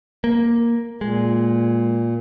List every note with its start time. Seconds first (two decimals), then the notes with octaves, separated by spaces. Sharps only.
0.24 A#3
1.01 A#2 G#3